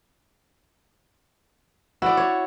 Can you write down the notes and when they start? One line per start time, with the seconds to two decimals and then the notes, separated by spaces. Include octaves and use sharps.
2.02 E4 F#4 D5
2.17 C#5